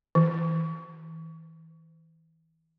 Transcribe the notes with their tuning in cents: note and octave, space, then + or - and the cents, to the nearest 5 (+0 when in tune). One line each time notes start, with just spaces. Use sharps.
E3 -35